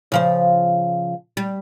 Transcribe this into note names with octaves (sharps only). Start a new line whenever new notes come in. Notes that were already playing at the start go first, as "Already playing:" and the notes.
C#3 F3 C5
G3